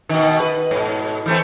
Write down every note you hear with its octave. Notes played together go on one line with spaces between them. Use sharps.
B2 D#3
B4
G#2 B2
E3 A3 C4